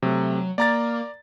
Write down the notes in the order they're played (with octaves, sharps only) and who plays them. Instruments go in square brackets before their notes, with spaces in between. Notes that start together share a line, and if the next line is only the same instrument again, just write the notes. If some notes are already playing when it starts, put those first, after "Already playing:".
[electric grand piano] C3 A3 [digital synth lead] F#3
[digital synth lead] A#3 [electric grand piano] D5 A#5 A6